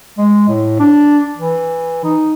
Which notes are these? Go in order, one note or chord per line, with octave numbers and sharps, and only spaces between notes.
G#3
A2
D4
E3
D#4